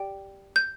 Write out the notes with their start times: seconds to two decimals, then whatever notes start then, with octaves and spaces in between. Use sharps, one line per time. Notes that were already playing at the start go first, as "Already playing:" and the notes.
Already playing: G4 D5 G5
0.56 G6